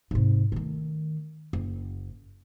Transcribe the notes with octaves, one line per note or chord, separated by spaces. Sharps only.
G#2 C3
D#3 A3
F#1